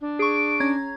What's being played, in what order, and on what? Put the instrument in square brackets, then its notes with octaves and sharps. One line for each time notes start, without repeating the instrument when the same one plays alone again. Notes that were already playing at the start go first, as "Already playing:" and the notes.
[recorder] D4
[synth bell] G#4 C#6 [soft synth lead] D7
[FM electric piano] C#4 A#5 [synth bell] G#6